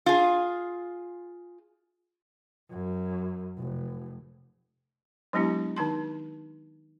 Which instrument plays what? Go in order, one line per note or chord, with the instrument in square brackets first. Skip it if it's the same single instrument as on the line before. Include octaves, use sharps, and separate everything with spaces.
[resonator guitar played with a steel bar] F4 G#4
[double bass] F#2
F1
[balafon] F#3 G#3 B3 D4 E4 G4
D#3 D#4 A5 C6